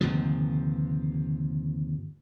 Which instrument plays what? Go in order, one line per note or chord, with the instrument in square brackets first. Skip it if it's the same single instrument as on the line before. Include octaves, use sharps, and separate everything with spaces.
[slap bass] G1 D#2 C3 F3